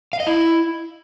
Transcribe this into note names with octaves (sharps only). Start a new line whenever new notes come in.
F5
D#5
E4